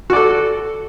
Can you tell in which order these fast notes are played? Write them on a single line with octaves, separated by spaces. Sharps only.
F#4 D5 A4